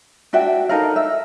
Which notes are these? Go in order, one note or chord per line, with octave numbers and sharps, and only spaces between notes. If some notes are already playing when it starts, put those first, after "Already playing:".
D4 F#4 E5 G5
D#4 A4 A#4 F5
E5